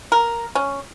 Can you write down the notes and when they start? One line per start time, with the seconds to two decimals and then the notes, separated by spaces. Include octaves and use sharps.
0.12 A#4
0.55 C#4